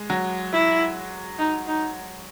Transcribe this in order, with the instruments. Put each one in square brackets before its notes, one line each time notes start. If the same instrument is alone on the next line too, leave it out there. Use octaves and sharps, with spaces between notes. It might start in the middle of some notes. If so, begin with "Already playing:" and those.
Already playing: [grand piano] G#3
F#3
[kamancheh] E4
D#4
D#4